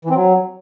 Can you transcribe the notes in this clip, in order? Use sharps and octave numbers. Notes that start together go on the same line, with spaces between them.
E3
C4
F#3